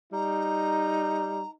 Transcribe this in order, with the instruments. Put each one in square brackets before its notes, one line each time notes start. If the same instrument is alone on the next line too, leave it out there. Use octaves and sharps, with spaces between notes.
[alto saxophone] G3 [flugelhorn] D#4 [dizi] A#5